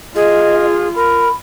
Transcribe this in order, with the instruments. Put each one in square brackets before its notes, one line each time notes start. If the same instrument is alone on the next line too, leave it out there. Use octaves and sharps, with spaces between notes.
[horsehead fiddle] F4 [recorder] G#4 [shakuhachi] D#5
[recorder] A#4 [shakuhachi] B5